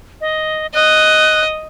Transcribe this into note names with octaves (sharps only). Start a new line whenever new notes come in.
D#5
D#5 F#6